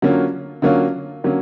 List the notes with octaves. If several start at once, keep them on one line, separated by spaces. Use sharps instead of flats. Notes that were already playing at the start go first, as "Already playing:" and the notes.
D3 F#3 A#3 C#4 F4
D3 F#3 A#3 C#4 F4
D3 F#3 A#3 C#4